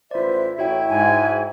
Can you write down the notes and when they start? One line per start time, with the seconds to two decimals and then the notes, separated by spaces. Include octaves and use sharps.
0.11 A1 F4 B4 C5 D5 E5
0.59 A1 E4 F#4 C#5 G5
0.88 G#2 G#5